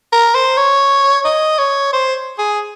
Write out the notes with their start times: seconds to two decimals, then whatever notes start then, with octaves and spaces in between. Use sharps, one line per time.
0.12 A#4
0.35 C5
0.57 C#5
1.25 D#5
1.59 C#5
1.93 C5
2.38 G#4